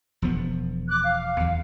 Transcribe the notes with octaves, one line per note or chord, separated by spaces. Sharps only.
E1 F3 B3
D6 F#6
F5
E2